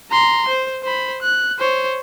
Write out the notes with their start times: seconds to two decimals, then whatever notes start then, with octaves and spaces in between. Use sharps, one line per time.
0.11 A#5 C6
0.48 C5
0.83 C5 B5
1.22 F#6
1.59 C5 C#5